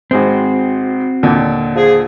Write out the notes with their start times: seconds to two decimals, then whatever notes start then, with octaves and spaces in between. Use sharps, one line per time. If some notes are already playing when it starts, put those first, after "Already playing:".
0.11 G#1 G#3 C4 F#4 C5
1.23 D#2 A#2 D3
1.75 F3 G#4